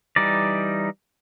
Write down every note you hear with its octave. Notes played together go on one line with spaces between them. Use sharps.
E3 G3 D#4 D5